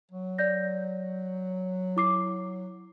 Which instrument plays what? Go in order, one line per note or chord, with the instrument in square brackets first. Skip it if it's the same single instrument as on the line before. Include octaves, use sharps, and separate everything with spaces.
[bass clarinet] F#3
[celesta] D5 G6 A#6
E4 D6 C7